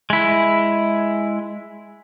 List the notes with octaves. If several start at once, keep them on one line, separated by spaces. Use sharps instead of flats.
G#3 E4